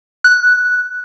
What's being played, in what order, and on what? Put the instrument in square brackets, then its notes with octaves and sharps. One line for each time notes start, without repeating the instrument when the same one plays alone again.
[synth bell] F#6